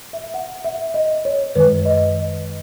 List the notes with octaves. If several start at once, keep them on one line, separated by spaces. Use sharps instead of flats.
E5
F#5
E5
D#5
C#5
F#2 D#3 G#3 B4
D#5